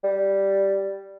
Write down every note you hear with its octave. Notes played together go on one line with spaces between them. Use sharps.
G3